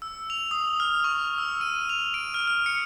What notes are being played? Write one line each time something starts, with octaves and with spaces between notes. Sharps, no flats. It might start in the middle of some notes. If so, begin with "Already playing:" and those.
E6
F7
D#6
F6
C#6
E6
D#7
F7
D7
F6
F6
C#7